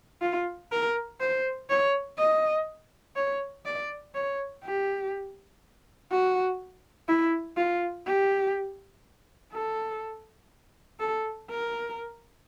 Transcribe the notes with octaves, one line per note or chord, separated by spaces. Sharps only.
F4
A#4
C5
C#5
D#5
C#5
D5
C#5
G4
F#4
E4
F4
G4
A4
A4
A#4